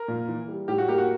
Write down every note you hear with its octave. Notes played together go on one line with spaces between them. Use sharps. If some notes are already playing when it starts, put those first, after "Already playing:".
Already playing: A#4
A#2
E3
G3
A2 G4
F#4
A#3 G4
F#4